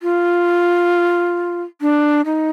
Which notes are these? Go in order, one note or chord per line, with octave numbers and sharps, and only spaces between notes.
F4
D4
D#4